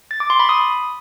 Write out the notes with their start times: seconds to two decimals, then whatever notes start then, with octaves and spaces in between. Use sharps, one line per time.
0.11 A6
0.20 D6
0.30 C6
0.40 B5
0.49 D#6